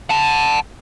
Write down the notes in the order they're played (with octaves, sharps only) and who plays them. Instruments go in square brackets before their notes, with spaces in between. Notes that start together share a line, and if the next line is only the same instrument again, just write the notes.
[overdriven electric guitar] F#5 A5